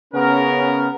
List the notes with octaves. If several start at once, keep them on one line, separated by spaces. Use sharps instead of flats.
C#3 B3 C#4 A#4